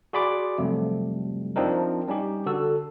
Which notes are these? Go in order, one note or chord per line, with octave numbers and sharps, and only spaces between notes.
F#4 G#4 D5 B5 C6 D6
F2 C3 F#3 G3 A3
F3 C4 D4 D#4 A#4
G3 C#4 D#4 G4
D3 F#4 A4 E6